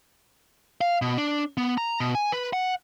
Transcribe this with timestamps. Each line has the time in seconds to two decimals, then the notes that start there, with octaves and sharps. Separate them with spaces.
0.81 F5
1.02 B2
1.18 D4
1.57 B3
1.78 A#5
2.00 B2
2.15 G#5
2.32 B4
2.53 F#5